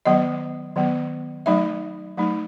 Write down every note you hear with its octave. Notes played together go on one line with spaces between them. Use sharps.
D#3 F#3 B3 D#5
D#3 F#3 B3
F#3 A3 D#4 E5
F#3 A3 D#4